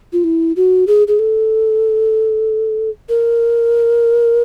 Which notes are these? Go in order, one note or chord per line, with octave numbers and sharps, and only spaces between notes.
F4
E4
F#4
G#4
G#4
A4
A#4